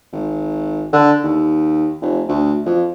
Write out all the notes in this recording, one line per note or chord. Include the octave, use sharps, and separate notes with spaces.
G#1
D3
D#2
F1
D2
F2